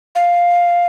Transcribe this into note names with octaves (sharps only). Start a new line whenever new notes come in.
F5